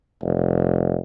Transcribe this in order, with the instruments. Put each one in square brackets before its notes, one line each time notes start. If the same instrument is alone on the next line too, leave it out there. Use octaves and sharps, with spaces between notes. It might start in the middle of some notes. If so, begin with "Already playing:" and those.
[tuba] F1